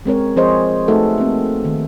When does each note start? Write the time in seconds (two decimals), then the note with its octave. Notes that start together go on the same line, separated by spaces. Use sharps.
0.06 G#3 C4 A#4 C#5
0.36 F3 C4 G#4 C5 C#5 D#5
0.88 A3 D#4 F#4 G#4 A4 B4
1.18 A#3 C4
1.65 D#3